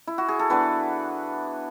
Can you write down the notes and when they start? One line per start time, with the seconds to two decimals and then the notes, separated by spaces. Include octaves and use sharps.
0.07 E4
0.18 F#4
0.29 G#4
0.39 A4
0.50 E3 B3 D4 B4